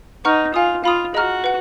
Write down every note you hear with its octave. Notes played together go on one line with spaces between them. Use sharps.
D#4 B4 F#5 A#5 C#6 F6
F4 F5 G#5 D#6
F4 F5 B5 D#6
F#4 G#4 D#5 A#5 F6
B4 F#5